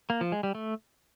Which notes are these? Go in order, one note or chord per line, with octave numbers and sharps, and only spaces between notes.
A#3
F3
G#3
G3
A3